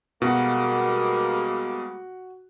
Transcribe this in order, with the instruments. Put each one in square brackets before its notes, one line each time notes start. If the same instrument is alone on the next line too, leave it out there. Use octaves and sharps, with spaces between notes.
[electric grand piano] B2 [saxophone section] G3 G#3 A#3 [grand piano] F#4 F#5